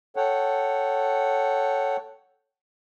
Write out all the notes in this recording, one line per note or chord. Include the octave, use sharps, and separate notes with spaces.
A4 C#5 F#5 G5